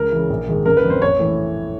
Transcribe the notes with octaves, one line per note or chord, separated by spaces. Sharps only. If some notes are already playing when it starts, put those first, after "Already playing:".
Already playing: C#2 A#4
C#3 E3
A#1
G#2 D#3 G#3
F#1 A#4
B4
F2 D3
C5
A#1 C#5
A2 E3 A3